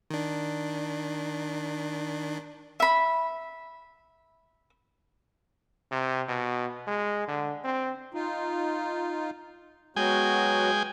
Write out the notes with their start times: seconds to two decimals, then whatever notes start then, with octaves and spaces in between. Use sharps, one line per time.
0.10 D#3 D4
2.80 E5 B5
5.91 C3
6.28 B2
6.87 G#3
7.28 D3
7.64 C4
8.14 D#4 F4
9.96 F#3 G#3 B3 F#4 G5 G#5